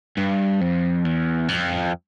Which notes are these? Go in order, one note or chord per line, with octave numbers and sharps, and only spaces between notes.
G2
F2
E2
F2